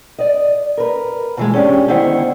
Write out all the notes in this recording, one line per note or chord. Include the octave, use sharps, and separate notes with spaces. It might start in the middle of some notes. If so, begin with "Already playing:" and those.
D5 D#5
A#4 B4
B2 E3 G#3
C#4 D4 G4 G#4
D3 D#3 B3 E4 C5 F#5